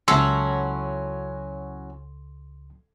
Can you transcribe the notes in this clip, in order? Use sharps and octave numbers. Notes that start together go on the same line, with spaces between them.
C#2 F#3 C#4 E4 A4 C6